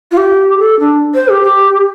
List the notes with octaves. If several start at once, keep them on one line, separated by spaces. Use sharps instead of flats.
F4
G4
A4
D4
C5
G4
G4